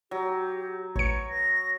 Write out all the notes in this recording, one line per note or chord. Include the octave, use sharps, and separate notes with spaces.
F#3 G4
A1 B4 C#5 C#7
A#6